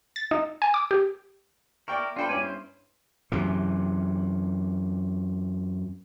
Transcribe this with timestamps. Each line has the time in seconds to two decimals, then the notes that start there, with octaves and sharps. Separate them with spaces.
0.16 A6
0.31 D#4
0.62 G#5
0.74 D6
0.91 G4
1.88 E4 A#4 D5 G5 C#6
2.16 D4 F4 A4 C5 G5 B5
2.29 G2 C#4 E4 D5 G#5
2.42 C5
3.32 F#2 C3 E3